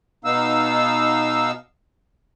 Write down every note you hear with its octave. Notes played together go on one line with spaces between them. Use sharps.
B2 B3 D#4 F5 E6